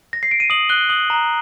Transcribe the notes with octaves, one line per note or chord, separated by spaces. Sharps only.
A#6
C7
D7
D#7
D#6 F#7
F#6 G7
D#6 F#7
A#5